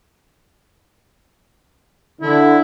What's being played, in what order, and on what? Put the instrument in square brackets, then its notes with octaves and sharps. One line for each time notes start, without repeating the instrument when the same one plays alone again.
[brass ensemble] D3 [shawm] E4